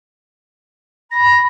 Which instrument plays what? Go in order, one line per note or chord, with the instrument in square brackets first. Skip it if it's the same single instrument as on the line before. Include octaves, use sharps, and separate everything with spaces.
[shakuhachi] B5 [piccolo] A#6